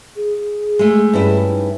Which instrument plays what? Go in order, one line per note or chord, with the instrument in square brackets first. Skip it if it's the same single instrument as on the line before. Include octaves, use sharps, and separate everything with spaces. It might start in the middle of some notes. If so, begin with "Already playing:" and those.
[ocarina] G#4
[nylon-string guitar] G#3 A3
G2 C#4 E4
[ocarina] D#4